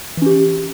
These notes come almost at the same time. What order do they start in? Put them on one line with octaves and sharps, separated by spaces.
E3 C#4 G4